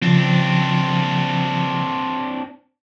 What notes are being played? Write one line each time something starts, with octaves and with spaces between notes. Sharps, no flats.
C#3 F3 C4 D4